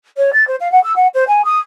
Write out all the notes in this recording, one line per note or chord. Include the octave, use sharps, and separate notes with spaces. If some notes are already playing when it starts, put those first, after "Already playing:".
C#5
A6
C5
F5
F#5
E6
F#5
C5
G#5
D#6